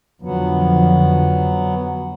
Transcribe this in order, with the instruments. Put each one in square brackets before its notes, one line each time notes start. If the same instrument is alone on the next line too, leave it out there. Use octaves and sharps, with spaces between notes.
[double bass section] F2 D3 F3 [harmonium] F#3 B3